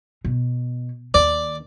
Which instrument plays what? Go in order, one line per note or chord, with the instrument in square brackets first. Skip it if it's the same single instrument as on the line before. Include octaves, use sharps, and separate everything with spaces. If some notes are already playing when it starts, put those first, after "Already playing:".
[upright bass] B2
[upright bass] D#2 [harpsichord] D5